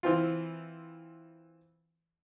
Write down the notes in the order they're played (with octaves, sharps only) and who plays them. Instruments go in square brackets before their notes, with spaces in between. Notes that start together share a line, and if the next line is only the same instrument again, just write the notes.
[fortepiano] E3 C4 F4